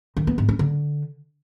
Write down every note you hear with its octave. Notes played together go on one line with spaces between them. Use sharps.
D#3
B3
G#2
C#4
D3